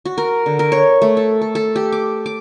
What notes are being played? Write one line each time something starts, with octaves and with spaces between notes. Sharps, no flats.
F#4
A#4
D3
A#4
C#5
A3
A4
A4
A4
G4
D6
D6